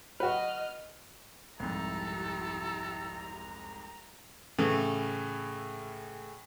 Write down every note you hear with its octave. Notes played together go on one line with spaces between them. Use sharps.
F#4 B4 D#5 F6
C2 F2 G#2 E4 G4 A4 A#5
A2 C#3 E3 A3